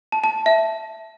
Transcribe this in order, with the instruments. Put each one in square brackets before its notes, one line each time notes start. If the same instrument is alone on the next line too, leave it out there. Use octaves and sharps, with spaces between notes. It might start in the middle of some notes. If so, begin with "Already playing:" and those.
[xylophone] A5
A5
E5